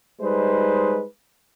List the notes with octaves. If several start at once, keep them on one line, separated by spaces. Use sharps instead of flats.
G3 G#3 D#4 B4 C5